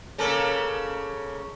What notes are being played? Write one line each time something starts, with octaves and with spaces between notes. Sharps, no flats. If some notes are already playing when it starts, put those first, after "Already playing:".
C#3 A#3 A4